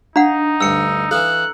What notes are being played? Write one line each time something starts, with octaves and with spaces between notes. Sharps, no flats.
D4 D#4 F5 F#5 A#5
D2 G2 E6 C#7
E3 D#4 A4 F5 F#6